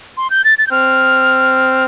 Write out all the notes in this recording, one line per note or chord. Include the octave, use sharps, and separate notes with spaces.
C6
G6
A6
A6
G6
C4 F6